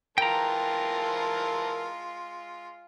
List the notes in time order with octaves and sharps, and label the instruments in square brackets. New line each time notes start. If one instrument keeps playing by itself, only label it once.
[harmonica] E3 A#4 A5 [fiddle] G#3 F4 [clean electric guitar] G5 A#5